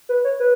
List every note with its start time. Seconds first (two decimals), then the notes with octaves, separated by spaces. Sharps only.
0.09 B4
0.24 C#5
0.40 B4